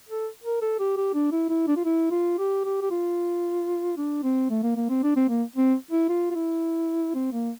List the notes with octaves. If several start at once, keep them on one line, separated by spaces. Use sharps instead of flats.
A4
A#4
A4
G4
G4
D4
E4
E4
D4
F4
E4
F4
G4
G4
G4
F4
D4
C4
A3
A#3
A#3
C4
D4
C4
A#3
C4
E4
F4
F4
E4
C4
A#3